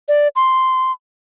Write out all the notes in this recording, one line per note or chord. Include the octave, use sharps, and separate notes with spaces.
D5
C6